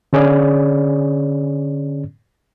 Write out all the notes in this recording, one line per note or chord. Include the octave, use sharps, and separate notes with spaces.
D3 C#4 G#4 C#5 D5